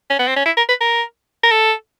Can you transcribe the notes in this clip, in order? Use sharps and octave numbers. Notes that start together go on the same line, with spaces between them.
C#4
B3
C4
C#4
E4
A#4
B4
A#4
A#4
A4